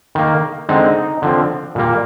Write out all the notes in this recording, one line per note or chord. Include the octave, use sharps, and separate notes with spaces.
D#3 A#3
D3 G#3 C4 D#4
D3 F3 C4
A#2 G3 A#3